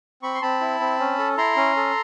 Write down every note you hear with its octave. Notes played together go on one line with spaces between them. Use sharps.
C4 B5 C#6
C6
C4 A5 B5
E4
C4
C#4
A4
E4 A#5 C6
C#4
A4